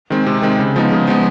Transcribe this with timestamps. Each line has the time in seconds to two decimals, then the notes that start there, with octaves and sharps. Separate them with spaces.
0.10 D#3 G#3 C4
0.26 C3
0.42 D#3 G#3 C4
0.59 C#3
0.76 F3 G#3 B3 D#4
0.92 C#3
1.07 F3 G#3 B3 D#4